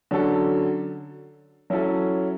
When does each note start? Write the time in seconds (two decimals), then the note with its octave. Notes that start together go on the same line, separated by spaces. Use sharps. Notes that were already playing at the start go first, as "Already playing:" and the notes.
0.11 D3 F#3 C#4 F#4 A4
1.70 F#3 C#4 E4 A4